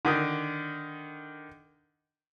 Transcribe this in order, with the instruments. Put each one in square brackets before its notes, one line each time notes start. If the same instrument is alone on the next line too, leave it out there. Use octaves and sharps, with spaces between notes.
[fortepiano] D3 D#3 D#6